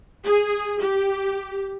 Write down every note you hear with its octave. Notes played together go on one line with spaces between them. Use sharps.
G#4
G4